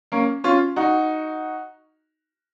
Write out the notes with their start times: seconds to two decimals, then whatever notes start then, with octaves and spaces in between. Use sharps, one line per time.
0.12 A#3 C#4
0.44 C#4 F4
0.76 D#4 F#4